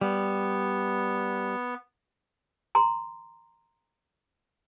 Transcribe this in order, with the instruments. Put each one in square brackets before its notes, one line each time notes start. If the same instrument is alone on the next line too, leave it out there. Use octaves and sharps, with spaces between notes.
[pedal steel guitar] G3 [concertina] B3
[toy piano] A#5 C6